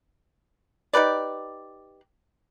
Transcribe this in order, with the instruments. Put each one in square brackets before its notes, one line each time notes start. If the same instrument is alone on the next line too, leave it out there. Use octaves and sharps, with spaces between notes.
[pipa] D#4 G4 B4 D5